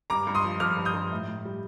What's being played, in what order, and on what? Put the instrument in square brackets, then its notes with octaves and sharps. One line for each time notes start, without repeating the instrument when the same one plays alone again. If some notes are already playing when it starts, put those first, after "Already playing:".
[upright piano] G2 A#5 D6
G2
C6 D#6
F3
F3 D6 F6
G2
D#6 G6
G2
A2
A2
G3